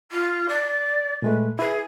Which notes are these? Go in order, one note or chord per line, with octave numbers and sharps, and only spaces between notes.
F4
D5
A#2 G#3 A3 B4
E4 G#4 B4